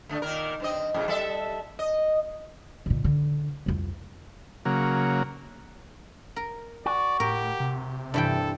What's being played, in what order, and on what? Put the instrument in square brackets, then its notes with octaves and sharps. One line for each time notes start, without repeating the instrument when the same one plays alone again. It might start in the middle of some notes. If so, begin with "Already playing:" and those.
[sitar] D3 A3
A#2 D#3 A#4
G2 C4 D#5
F#2 A2 C#3
G3 A4 E5
D#5
[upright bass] A#2 D3
D3
C2 F2
[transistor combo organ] C#3 F#3 A#3
[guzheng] A#4
[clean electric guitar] F#4 [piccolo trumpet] D5
[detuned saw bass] A2 [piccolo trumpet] G4 [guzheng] A#4
[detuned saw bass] C3
[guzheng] G2 E3 G5 [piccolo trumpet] A4